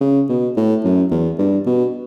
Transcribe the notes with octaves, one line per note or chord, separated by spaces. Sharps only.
C#3
B2
A2
F#2
E2
G2
B2